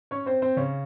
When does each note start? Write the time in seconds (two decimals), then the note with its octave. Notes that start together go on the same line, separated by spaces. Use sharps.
0.11 C#4 C#5
0.26 C4 C5
0.42 C4 C5
0.57 C#3 C#4